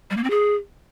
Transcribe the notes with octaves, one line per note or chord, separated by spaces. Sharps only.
G3
A#3
C4
G#4